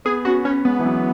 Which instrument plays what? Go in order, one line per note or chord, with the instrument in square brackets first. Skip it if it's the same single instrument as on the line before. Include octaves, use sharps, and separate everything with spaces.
[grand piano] B3 [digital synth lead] G#4
[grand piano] C#4 [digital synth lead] F#4
[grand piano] B3 [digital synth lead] C#4
[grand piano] G#3 [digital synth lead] B3
[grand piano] E3
F#3